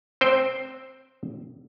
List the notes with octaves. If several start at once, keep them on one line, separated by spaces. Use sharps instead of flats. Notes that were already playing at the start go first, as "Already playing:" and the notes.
C4 C5 G5